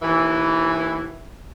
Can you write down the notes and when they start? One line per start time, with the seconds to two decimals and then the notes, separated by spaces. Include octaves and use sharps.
0.02 D#2 B2 E3